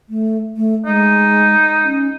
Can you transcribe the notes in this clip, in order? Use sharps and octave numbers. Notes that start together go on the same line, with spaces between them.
A3
A3
G#3 D#4
C#4